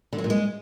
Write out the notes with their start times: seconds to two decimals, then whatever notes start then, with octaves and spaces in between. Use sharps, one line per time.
0.13 D3
0.18 F#3
0.24 A#2
0.30 G#3